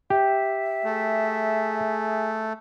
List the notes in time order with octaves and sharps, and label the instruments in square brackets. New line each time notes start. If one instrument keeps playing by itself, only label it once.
[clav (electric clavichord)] G4 [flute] E5
[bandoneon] A3 [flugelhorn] G#4